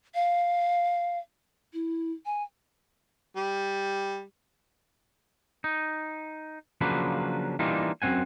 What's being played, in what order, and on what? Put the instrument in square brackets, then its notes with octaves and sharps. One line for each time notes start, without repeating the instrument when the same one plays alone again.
[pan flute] F5
E4
G#5
[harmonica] G3
[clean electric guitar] D#4
C#3 F3 F#3 A#3 D4 B4
E3 G3 A#3 D4 D#4 F4
F#2 F#3 C4 F#5 G#5